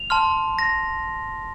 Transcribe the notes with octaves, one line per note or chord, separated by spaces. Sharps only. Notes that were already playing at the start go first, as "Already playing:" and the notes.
Already playing: F7
A5 C6 F6
A#6